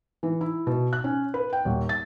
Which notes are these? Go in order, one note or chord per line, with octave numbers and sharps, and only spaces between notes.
E3
E4
B2
F#6
C#4
B4
G5
D#1
A6